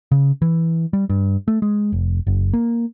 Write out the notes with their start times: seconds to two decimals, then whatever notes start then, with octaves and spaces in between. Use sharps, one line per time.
0.12 C#3
0.42 E3
0.93 G3
1.10 G2
1.48 A3
1.62 G#3
1.92 F1
2.27 F#1
2.53 A#3